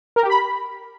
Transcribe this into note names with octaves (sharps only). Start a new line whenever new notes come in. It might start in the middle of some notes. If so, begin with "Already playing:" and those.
A#4
G4
B5